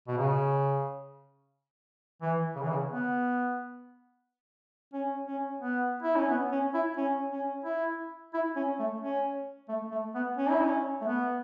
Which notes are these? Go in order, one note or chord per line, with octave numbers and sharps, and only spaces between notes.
B2
C#3
E3
C#3
E3
C#3
B3
C#4
C#4
B3
E4
C#4
B3
C#4
E4
C#4
C#4
E4
E4
C#4
A3
C#4
A3
A3
B3
C#4
E4
C#4
A3
B3